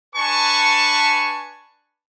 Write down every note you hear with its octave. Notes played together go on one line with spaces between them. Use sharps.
D4 B4 G#5 A5 C#6